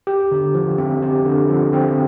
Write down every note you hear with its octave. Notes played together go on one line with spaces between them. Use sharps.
G4
D3
F3
C4
G4
D3
F3
C4